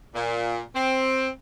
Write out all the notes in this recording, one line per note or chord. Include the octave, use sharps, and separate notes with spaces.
A#2
C4